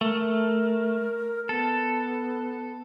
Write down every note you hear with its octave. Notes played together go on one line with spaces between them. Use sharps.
A3 A#4
B3 A4